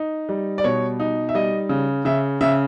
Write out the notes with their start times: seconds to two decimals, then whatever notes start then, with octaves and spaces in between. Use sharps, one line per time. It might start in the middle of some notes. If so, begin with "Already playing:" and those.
Already playing: D#4
0.29 G3
0.58 D5
0.64 B2 C#5
1.00 D#4
1.29 E5
1.34 G3 D#5
1.69 C#3
2.05 C#3 E5
2.41 C#3 E5